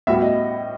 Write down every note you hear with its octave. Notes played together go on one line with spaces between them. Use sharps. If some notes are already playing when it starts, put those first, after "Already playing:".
A2 G3 B3 F#4 E5
D#5